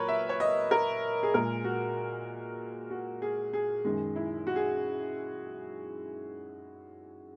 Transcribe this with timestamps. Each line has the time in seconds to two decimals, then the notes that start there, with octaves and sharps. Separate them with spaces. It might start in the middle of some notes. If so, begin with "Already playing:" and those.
Already playing: A#2 F#3 A#4 B4 C#5
0.08 E5
0.29 C#5
0.40 D#5
0.71 A#4
1.23 G#4
1.34 A#2 G#3 A#4
1.64 F#4
2.90 F#4
3.22 G#4
3.53 G#4
3.85 F#2 D#3 G#3
4.16 E4
4.47 F#4
4.56 G#4